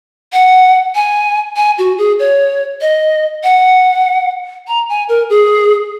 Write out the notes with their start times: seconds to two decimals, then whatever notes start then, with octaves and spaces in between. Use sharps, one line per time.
0.33 F#5
0.95 G#5
1.56 G#5
1.78 F#4
1.98 G#4
2.19 C#5
2.81 D#5
3.44 F#5
4.68 A#5
4.89 G#5
5.09 A#4
5.30 G#4